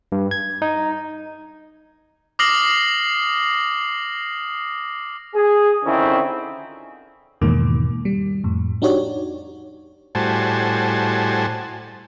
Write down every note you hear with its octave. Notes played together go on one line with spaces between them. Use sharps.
G2
G#6
D#4
D6 D#6 F6 A#6 C7 F#7
G#4
F2 D3 D#3 C4 C#4 E4
E2 G#2 B2 D#3 A#3 D6
G3
F2 A2
D4 D#4 F#4 G4 C#5 D5
A2 G3 F#4 C5 G#5 A5